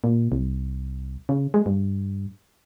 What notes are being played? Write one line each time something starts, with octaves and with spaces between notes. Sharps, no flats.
A#2
C2
C#3
G#3
G2